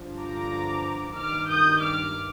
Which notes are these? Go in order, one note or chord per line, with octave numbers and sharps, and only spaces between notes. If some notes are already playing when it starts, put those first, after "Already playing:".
Already playing: G2 D3 F3
A#5 D6
G2 D#3 D6 F6
D#6 G6
D6 F6